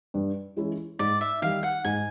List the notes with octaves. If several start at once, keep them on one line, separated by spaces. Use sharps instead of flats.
G2
E3 G#3 C#4 E4
G#2 D5
E5
D#3 G3 F5
F#5
G#2 G#5